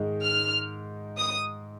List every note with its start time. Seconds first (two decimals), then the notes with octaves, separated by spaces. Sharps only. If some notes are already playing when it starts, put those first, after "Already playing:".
Already playing: G#2 D#3 G#3 D#4
0.21 F6
1.18 D#6